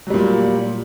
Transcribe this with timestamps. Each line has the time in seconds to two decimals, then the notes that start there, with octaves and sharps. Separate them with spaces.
0.07 F#3
0.10 G3
0.14 A#2